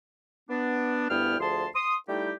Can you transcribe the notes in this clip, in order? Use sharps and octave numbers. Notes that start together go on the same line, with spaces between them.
B3 D4
D2 G2 B3 E4 G5 F6
D2 F3 G#4 A5 C6
C6 D#6
G3 A3 D#4 E4 G4 G5